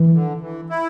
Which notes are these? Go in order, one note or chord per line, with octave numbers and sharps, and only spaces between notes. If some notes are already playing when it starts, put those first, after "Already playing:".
Already playing: E3
D3
E3
E4